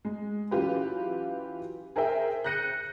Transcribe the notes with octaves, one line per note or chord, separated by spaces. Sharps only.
G#3
E3 F#3 C#4 F4 G4 B4
G#4 A#4 C5 E5 G5
F#6 G6 A#6 C#7 D#7